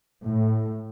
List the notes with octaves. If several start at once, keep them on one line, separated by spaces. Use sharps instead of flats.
A2